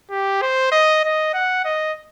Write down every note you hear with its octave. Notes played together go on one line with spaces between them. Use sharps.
G4
C5
D#5
D#5
F#5
D#5